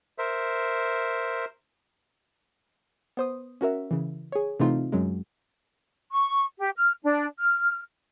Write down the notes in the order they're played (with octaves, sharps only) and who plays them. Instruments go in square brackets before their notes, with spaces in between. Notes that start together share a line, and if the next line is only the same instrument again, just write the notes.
[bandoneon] A#4 C5 E5
[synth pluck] B3 C5 D#6
C#4 F#4 A#4 E5
C#3 E3
G#4 C#5
C3 E3 A3 C4 D#4 F4
F#2 F#3 G#3
[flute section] C#6
G4
F6
D4
F6